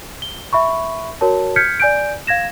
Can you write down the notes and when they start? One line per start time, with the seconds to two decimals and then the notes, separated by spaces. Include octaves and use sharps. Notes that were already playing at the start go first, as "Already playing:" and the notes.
0.22 G7
0.53 E5 B5 C#6
1.21 F#4 A#4 C#5 A5
1.56 F6 G6 G#6 B6 C#7
1.80 D5 G#5 G6 D7
2.27 F5 G#6 A#6 E7